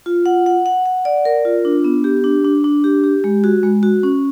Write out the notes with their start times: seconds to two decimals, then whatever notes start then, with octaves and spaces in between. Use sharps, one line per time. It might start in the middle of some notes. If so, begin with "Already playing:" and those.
0.06 F4
0.26 F#5
0.46 F#5
0.66 F#5
0.86 F#5
1.05 D5
1.25 A#4
1.45 F4
1.65 D4
1.84 B3
2.04 G4
2.24 D4
2.45 D4
2.64 D4
2.84 G4
3.04 G4
3.24 G#3
3.44 F#4
3.63 G#3
3.83 F#4
4.03 C#4